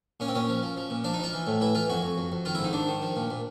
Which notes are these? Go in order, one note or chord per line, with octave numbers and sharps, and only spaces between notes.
A#2 C#4
C4
A#2 C#4
F3
F3
F3
A#2
F3 D4
D#4
F3 F4
E3
A2
E3 E4
E3 F4
F2 F#4
F2
F2
F2
D#3 F4
E4
G#2
D#4
D#3 D4
D#3
F3
A#2
A#2